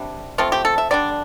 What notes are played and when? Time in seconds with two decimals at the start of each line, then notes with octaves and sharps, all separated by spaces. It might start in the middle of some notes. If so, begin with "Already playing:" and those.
Already playing: C3 G3 D4
0.38 F3 A3 C4 F4
0.52 G4
0.65 A4
0.78 E5
0.91 D3 G3 D4 D5